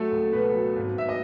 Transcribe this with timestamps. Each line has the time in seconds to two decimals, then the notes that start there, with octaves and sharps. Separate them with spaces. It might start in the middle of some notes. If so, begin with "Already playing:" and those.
Already playing: F#3 A3 A4
0.11 C#2
0.33 B2 B3 B4
0.54 F#3
0.76 G#1
0.96 G#1 E5
1.09 D#5